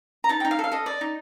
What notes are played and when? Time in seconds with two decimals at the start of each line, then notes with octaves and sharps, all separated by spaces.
0.24 A#5
0.29 D#4 A5
0.40 D#4 G5
0.51 F5
0.59 A4
0.64 F5
0.72 A4 D#5
0.86 D5
1.01 D#4